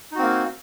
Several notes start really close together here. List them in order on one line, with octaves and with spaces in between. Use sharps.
D#4 F#4 C4 A#3